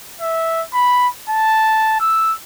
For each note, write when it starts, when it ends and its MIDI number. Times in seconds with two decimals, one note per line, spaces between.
0.21 0.62 76
0.74 1.08 83
1.30 1.96 81
2.01 2.33 88